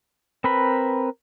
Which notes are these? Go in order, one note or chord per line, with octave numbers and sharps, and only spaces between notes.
C4 A#4 B4 B5